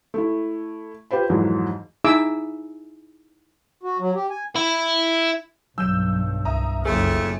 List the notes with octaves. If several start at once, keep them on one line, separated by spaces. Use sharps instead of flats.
A3 E4
F4 G4 B4 C5 B5
F2 G#2 E3 F#3
D#4 E4 G#4 E5 D6 E6
F#4
F#3
G4
G#5
E4
B1 G2 F#3 E6 G6 E7
C2 E5 A#5 D#6
F#1 F2 A3 A#3 G#4